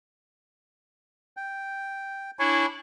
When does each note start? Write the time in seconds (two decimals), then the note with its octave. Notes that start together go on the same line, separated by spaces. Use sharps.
1.37 G5
2.39 D4 E4 C#5 G#5 C#6